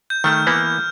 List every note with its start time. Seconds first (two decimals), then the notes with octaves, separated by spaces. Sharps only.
0.10 G6
0.24 D#3 A3 F6 G6
0.47 E3 A#3 B3